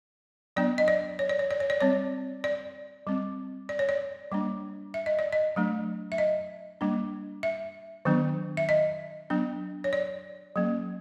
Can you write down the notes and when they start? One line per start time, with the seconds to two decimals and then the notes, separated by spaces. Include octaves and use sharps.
0.56 F#3 B3 D4 D5
0.78 D#5
0.88 D5
1.19 C#5
1.29 D5
1.39 C#5
1.51 D5
1.60 C#5
1.70 D5
1.81 G3 C4 C#5
2.44 D5
3.07 G3 C4
3.69 D5
3.79 C#5
3.89 D5
4.32 G3 A#3 D4
4.94 E5
5.06 D#5
5.19 D5
5.32 D#5
5.56 F#3 A3 D4
6.12 E5
6.18 D#5
6.81 G3 A#3 D4
7.43 E5
8.05 D#3 F#3 B3 D4
8.57 E5
8.69 D#5
9.30 F#3 B3 D4
9.84 C#5
9.93 D5
10.56 F#3 A#3 C#4